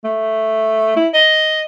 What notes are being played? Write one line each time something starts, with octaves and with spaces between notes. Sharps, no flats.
A3
E4
D#5